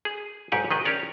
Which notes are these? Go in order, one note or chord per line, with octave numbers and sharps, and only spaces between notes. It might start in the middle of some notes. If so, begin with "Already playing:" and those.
G#4
B1 G#2 G4 F#5 G#5
D#3 G#4 B4 D#5
C#4 G4 A#4 C#5 D5